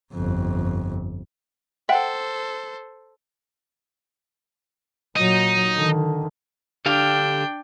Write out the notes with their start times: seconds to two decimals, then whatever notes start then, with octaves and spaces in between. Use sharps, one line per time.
0.12 G1 F2
1.89 A4 C5 E5 F#5 G5
5.16 A#2 F#3 D#4
5.76 D3 D#3
6.86 D3 D4 G4 F5 G5